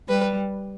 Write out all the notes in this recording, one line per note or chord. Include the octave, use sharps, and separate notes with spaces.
G3 B4